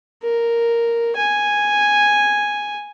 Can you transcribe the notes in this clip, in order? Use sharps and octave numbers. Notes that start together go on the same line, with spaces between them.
A#4
G#5